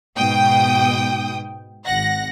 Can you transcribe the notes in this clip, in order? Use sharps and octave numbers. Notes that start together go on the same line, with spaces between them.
G#2 B2 G5 D#6
G#1 F#5 A#6